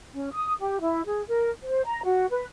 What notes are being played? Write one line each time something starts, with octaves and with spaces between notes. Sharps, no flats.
C#4
D#6
G4
E4
G#4
A#4
C5
A#5
F#4
B4